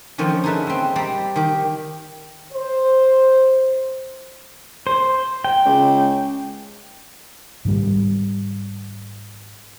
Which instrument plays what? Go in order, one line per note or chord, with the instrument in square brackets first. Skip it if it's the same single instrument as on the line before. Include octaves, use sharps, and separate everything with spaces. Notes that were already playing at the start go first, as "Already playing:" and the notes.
[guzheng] D3 D#3 F3 C#4 F4
D#4 G#4 A4 B4 E5
G#3 C4
G3 C5 D5 A#5 B5
D#3 G4
[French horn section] C5
[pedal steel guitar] C5
G5
[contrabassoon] C#2
[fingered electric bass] G#2 D#3 G3